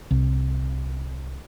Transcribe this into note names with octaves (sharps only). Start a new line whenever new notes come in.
C2